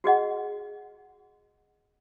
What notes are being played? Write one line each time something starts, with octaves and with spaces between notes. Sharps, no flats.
F#4 G#4 D#5 F#5